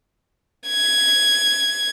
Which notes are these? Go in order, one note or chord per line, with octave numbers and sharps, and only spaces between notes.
G#6